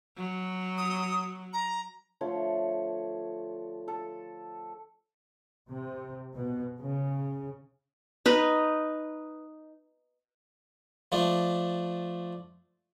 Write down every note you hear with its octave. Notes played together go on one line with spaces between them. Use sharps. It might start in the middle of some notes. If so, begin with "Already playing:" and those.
F#3
D#6
A#5
D3 F3 A3 C#5
A4
C3
B2
C#3
D#4 B4
F3 A3 D4